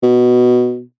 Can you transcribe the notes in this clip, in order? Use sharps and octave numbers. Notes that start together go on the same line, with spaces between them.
B2